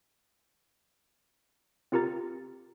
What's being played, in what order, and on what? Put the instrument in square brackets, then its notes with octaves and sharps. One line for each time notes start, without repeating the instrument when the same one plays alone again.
[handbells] C4 F4 G4 A#4 A#5 A6